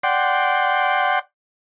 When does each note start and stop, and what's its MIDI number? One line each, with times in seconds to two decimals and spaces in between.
0.03 1.19 74
0.03 1.19 78
0.03 1.19 79
0.03 1.19 84